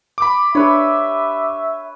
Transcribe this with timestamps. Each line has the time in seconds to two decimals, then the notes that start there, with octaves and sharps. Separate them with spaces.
0.18 B5 D6
0.55 D4 G4 B4 C#5 E5